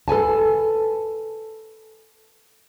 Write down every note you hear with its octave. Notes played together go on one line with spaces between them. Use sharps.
A4 B4 G#5 A5